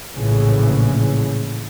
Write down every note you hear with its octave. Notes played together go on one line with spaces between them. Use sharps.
A#1 A2 C#3 E3